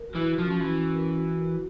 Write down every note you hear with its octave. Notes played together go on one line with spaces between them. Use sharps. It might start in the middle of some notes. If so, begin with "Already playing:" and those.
Already playing: A#4
E3 F#4
F#4
F3
C#4
F3
E3 F#4
C#4
A#4
F#4
F#4
F#4